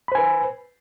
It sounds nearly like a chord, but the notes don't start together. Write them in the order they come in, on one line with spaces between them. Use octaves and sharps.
B5 C5 G#5 B4